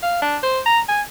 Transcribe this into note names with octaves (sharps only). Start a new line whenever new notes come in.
F5
D4
C5
A#5
G#5